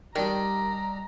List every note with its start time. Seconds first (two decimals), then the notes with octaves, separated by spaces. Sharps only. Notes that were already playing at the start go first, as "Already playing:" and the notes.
0.15 D#3 G3 D4 G4 A#4 D#5 A#5